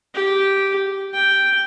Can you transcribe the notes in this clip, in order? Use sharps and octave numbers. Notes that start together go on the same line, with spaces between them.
G4
G5